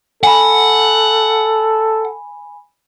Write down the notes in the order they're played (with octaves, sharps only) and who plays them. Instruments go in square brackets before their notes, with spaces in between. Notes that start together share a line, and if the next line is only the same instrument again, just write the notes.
[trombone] A4 [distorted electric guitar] F#5 [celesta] G#5 B5